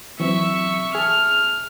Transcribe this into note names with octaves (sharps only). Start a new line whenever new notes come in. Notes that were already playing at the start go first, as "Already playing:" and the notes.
E3 F#3 C4 E5 C#6
G#4 A5 F6